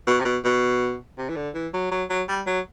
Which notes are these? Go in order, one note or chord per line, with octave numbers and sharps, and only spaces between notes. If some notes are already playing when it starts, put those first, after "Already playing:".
B2
C3
B2
B2
C3
E3
D3
E3
F#3
F#3
F#3
G3
F#3